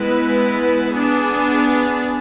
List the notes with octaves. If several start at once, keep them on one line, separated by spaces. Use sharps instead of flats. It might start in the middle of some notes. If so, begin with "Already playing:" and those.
Already playing: G#3 B3 E4 B4
B3 D4 G#4